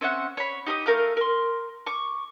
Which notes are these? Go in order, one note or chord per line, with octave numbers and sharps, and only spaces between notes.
C4 C#4 E5 F#5
C#5 B5
D#4 G4 B5 D#6
A3 A#4 F5 G6
A#4 C6
C#6 D6